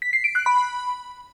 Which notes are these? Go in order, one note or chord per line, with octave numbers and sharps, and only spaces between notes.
B6
C7
D7
F#6
B5